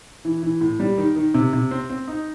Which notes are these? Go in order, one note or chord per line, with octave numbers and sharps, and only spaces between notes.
E3
E3
A2
G3
D#3
D#3
C3
C3
C4
C4
D#4